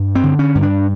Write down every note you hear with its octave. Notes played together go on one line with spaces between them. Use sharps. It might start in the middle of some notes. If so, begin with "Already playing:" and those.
Already playing: G2
C4
D3
C#4
G2
D4